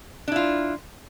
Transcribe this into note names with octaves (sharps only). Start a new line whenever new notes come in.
D4 E4 F4